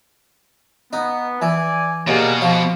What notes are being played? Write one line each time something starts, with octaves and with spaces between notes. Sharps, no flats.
B3 D#4
E3 D5 G#5
D#2 B2 G#4 A#4 D5
F3 G4 C5